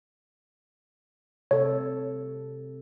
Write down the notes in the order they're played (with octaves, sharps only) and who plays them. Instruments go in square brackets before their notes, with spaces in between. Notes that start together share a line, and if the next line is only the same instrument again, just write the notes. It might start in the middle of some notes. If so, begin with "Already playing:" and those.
[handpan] C3 A4 [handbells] C#5